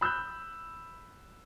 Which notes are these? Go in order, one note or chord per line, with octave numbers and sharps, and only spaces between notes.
B5 E6 F#6 G6